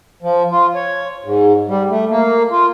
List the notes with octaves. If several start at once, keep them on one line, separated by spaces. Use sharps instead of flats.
F3
F4
C#5
G#2
G3
A3
A#3
F4